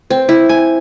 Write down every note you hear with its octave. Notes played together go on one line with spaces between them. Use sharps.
C4
E4
G#5